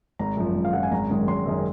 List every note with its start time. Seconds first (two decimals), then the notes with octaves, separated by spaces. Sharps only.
0.19 G#1 A#5
0.37 F#2 F3
0.55 G#1
0.65 F5
0.73 F#2 F3 F#5
0.83 G#5
0.91 G#1 A#5
1.10 F#2 D#3 G#3 C#4
1.28 G#1 C6
1.46 F#2 D#3 G#3 C#4